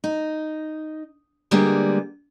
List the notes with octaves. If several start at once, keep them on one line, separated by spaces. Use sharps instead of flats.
D#4
D3 G3 G#3 A#3 B3